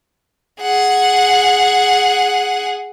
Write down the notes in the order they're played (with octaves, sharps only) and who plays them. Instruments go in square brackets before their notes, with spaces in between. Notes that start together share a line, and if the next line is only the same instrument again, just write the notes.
[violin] G#4 F#5